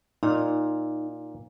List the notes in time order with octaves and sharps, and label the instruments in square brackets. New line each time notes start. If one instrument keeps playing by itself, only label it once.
[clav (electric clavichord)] A#2 [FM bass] D#4